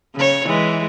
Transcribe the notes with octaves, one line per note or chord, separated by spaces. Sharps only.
C#3 C#5
E3 G#3